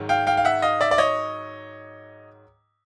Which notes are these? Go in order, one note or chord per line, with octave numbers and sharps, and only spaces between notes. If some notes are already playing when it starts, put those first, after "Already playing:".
Already playing: G#2 D#3 F#3
F5 G5
F5 G5
F5
E5 F#5
D#5 F5
D5 E5
D5
C#5 D#5